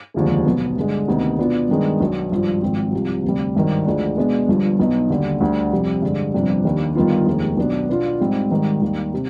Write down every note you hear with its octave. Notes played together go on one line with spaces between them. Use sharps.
F1 D#2 D3 F3 G#3
B1 B2 B3
G2 D3 G#3
D2 C3 D#3 B3 D#4
B2 B3 D4 F4
G2 D#3 G#3 B3 D4
B1 B2 B3 D4
G#1 G2 F3
G#1 G#2 F3 C4
C2 C3 F3
D2 C3 G3
G#1 G2 D#3 G3
D2 D3 F3 G#3 D4
B2 G#3 B3 D4
G1 G2 F3
B1 B2 B3 D#4
D#2 D3 G3
D2 D3 G3
F2 C3 G3
G2 D3 G#3
G1 F2 C3 G3 D4
D#2 D#3 G3 D4
G1 G2 D#3 B3 F4
F1 D#2 D#3 G#3
B1 B2 B3 D4
B2 B3 D4 F4
G#2 G3 C4 D#4
G#2 D#3 G3
D#2 D#3 G3
C3